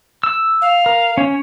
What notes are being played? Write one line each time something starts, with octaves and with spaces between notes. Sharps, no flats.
E6
F5
A#4
C#4 C#5